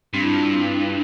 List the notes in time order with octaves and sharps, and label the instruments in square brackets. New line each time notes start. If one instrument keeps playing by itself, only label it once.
[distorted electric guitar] G2 [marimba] C4
[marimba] E4
F4
E4
C4